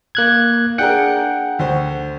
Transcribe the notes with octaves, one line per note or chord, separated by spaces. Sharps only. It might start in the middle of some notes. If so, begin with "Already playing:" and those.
A#3 F#6 G#6
D4 G#4 A#4 F#5 G5 C#7
D2 C5